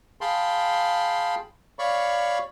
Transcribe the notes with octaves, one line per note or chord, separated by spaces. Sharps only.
G#4 F5 G5 A5 B5 C6
C#5 D5 F5 B5 C#6